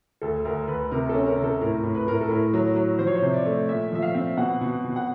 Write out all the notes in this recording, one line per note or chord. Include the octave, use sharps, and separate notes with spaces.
D2 A4
D2 A#4
D2 B4
C3 A#4
C#4 A4
A#4
C3
A4
A2 A#4
A2
B4
A2 A#4
A4
A2 A#4
F#3
F#3
F3 C5
C#5
C5
C3
D5
A3
A#2 E5
F3 E5
F5
C4
B2 F#5
B2
B2
F#5